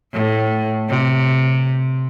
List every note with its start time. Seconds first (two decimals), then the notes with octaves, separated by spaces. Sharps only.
0.13 A2
0.89 C3